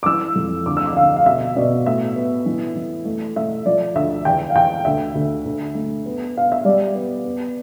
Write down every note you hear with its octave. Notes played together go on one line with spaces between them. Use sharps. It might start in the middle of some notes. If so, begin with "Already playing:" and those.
D6
E3 E6
F2
D2 D6
E6
D6
D3 F5
F5
B2 E5
B2 D5
A2 E5
B3
E3
E3
A3
A3 E5
F3 D5
D2 E5
E2 G5
F5
E2 G5
D2 E5
D2
D2
A3
B3
B3 F5
E5
G3 D5
B3
B3